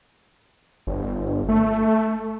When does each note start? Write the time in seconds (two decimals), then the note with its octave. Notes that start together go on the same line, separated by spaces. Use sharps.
0.87 G1
1.49 A3